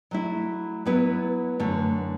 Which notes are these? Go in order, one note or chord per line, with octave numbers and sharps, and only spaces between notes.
F#3 A3 E4
F#3 B3 E4 B4
F#2 D3 A3